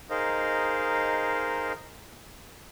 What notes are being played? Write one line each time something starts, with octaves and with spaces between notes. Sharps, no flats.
D#4 G#4 A#4 C5 D#5 F5